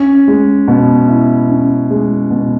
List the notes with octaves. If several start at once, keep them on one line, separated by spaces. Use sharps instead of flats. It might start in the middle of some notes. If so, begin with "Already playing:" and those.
Already playing: C#4
G#3
B2
E4
C#4
G#3
B2